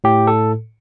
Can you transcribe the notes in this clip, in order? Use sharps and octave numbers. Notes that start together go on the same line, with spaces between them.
A2 G4
A4